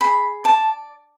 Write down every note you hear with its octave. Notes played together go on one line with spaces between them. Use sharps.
G#4 B5
D5 A5